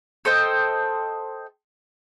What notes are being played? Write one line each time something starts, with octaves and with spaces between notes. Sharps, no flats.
A4 C5 D#5 G5